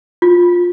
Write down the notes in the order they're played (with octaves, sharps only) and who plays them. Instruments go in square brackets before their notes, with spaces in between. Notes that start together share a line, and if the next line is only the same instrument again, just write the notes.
[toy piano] F4